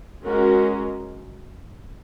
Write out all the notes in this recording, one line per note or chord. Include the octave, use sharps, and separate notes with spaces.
G#3 C#4 F#4 A#4